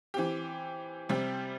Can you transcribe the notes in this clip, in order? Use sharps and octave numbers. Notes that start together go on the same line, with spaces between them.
E3 C4 G4
C3 G3 C4 G4